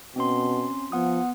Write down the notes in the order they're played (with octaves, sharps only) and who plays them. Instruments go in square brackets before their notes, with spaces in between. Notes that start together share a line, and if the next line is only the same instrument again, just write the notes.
[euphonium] B2 [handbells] C4 C#4 C6
[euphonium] F3 [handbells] B3 F#5 D#6